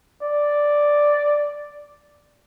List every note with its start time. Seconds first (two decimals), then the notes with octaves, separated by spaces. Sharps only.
0.22 D5